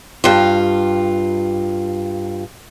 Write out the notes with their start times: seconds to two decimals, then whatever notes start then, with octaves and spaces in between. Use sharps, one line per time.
0.24 G2 F4